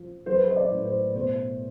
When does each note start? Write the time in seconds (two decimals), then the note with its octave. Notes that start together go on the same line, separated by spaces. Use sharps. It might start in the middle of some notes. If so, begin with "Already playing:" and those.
Already playing: F3
0.26 F#3 C5
0.35 B4
0.44 C5
0.50 D#5
0.56 D5
0.70 A2
0.85 C5
1.15 B2 C5